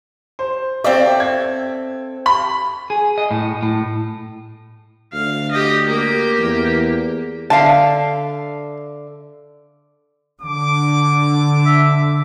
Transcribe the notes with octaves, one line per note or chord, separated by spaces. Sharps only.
C5
C4 A4 D5 E5 F5 G5
G#6
B5
G#4
D#5
A2
A2
D2 F5
G4 D#5
A#3 G4
E2
D3 E5 F5 A5
D3 D6
E5